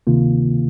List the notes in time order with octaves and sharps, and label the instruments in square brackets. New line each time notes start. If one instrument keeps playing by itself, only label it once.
[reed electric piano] D2 C3 D#3 A#3 F4